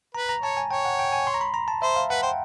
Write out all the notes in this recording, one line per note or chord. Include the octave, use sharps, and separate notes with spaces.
B4 A#5
A#5
C#5 A5
G#5
C#5 G5
F#5
G5
G#5
C6
A#5
B5
A#5
A5
C5 E5
F5
B4 F#5
C5 G5